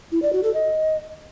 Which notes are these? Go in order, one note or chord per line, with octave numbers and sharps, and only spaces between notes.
E4
D5
F#4
A4
D#5